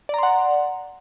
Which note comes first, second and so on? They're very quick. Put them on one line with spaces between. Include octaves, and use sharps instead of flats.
D5 A#5 C6 F#5